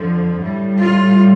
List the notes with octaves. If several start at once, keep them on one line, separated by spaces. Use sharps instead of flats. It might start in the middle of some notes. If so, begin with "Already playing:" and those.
Already playing: F2 D3 F3
A2 G3
F4